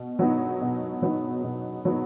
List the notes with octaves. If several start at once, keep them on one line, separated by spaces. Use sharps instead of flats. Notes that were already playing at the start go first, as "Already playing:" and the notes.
Already playing: B2
F#3 B3 D#4
B2
F#3 B3 D#4
B2
F#3 B3 D#4